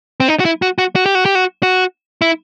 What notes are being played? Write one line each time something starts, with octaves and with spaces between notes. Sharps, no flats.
C4
D#4
F#4
E4
F#4
F#4
F#4
G4
F#4
G4
F#4
F#4
E4